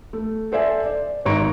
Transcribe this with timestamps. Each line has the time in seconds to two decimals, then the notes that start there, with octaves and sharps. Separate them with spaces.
0.13 A3
0.52 A4 C5 D5 E5 G#5
0.86 D5
1.25 G#1 C#5 A#5 C#6 D7